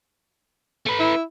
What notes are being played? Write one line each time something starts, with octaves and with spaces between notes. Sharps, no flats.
A3 B4
E4